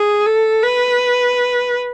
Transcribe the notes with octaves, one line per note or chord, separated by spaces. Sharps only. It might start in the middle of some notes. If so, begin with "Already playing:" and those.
Already playing: G#4
A4
B4